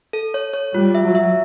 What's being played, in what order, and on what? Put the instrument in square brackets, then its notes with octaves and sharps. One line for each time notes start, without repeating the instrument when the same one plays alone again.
[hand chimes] A4
C#5
C#5
[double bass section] G3 [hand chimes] F4
[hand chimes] E5
[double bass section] F#3
[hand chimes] E5